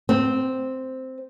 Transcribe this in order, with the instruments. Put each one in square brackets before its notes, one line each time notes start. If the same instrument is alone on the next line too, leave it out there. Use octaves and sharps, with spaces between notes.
[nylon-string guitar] C4